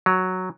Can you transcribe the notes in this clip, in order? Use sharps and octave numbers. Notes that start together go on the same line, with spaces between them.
F#3